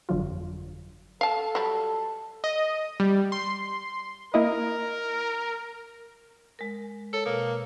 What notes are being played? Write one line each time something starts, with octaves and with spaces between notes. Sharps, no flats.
G1 F2 D3 F#3 F4
A4 F5 A5
F#3 G3
D#5
G3
C6
A#3 E4 A#4 D#5
G#3 A#4
A4 C#5
B2 A#3